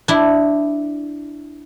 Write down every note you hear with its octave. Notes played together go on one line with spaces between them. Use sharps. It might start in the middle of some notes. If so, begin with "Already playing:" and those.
D4 E4